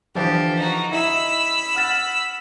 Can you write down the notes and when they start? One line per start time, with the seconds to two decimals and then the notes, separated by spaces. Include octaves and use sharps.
0.15 D3 E3 F3 G4
0.57 D#4 F#4
0.92 E4 D#5 B5 E6
1.75 F#5 F6 A6